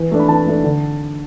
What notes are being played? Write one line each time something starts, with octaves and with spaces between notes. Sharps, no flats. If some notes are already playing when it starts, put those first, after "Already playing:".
Already playing: E3
A3 D4
B5
E3 A5
A3 D4
D3